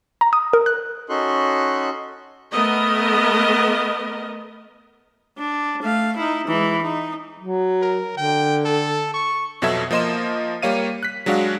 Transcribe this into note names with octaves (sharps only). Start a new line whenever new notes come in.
A#5
D#6
A#4
F#6
C#4 D#4 F#4 A4 C6 F#6
A3 B3 A#4 D#5
D4
A3 F5
D#4 E4
E3 G#3
D#4
F#3
A#4
D3 G5
A4
C#6
F2 B2 F#3 A4 E5 G#6
F3 A#3 D#5 C6 E7
G3 A#3 C#5 F5 D#7
F#6 B6
F#3 G#3 D4 F#4 F5